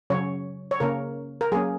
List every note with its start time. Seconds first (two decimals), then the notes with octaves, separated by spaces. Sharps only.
0.10 C#3 F#3 C#4 C#5
0.71 C#5
0.80 C#3 A#3 C#4 A#4
1.41 A#4
1.52 F#3 A#3 C#4 G#4